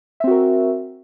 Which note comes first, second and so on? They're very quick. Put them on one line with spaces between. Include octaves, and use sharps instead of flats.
E5 C4 F#4 A#4